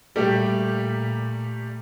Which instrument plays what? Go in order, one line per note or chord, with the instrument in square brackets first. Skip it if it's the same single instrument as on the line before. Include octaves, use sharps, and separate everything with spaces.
[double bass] A#2 [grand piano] G3 A3 G4